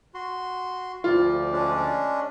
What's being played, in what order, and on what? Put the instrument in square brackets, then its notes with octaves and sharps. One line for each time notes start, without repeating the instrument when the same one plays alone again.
[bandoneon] F#4 C6
[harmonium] D2 F3 D5 [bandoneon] G3 [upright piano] F4
[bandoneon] G#3 C#4 D4